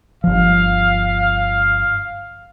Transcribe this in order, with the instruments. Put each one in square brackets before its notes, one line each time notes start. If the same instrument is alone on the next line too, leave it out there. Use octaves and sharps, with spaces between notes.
[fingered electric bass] G1 F3 [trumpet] F5